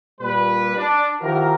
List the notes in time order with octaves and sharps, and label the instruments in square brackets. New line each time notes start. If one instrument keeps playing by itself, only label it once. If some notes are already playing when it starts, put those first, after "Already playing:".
[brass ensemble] A#2 G3 B4
D4
D#3 F3 E4 F#4 G4 A#4